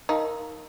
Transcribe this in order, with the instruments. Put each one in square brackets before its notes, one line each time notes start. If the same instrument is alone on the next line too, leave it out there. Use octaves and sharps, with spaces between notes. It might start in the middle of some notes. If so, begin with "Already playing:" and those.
[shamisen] D#4 [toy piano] A#4 F5 A5 C6